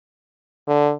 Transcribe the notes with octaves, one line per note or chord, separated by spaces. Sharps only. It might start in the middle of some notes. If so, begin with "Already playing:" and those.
D3